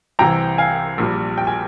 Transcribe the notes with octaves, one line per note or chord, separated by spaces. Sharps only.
C2 C3 E3 G5 A#5
F5 G#5
A#1 A#2 G3
G5
G#5